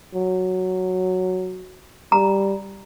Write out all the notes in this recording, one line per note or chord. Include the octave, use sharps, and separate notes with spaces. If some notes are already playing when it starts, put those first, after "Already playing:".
F#3
G3 A#5